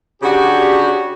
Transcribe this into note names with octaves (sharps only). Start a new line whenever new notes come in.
C#3 D4 F#4 G4